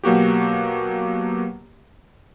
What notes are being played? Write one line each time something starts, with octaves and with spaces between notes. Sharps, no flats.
B2 F#3 A#3 F#4 G4